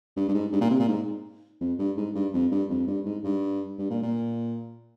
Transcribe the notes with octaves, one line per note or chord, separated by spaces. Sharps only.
G2
G2
G#2
G2
A#2
C3
A#2
G#2
F2
G2
G#2
G2
F2
G2
F2
G2
G#2
G2
G2
A#2
A#2